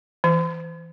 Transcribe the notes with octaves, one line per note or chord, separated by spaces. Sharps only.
E3